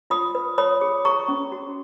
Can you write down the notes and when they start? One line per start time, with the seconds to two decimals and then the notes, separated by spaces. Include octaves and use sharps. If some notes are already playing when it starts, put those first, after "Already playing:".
0.10 F4 B5 D#6
0.35 B4
0.58 C#5 B5 D#6
0.81 G#4
1.05 G#4 A#5 C#6
1.28 C#4
1.52 F#4